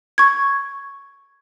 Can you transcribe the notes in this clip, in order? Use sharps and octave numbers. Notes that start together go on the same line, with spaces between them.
C#6 G#6